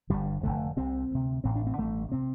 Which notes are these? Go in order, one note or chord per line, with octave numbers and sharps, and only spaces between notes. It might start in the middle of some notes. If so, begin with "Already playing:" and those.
G1 G2 D3 G3
F1 F2 D3 A3
C2 C3 C4
D2 C3
A1 A2 C4
D4
C4
A1 G2 D3 A3
C3 C4